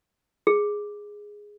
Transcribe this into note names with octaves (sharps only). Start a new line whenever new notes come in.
G#4